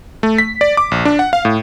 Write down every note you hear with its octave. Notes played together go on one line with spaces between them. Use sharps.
A3
B6
D5
D6
A#1
D4
F#5
F5
A2